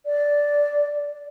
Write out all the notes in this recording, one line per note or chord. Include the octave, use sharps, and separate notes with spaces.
D5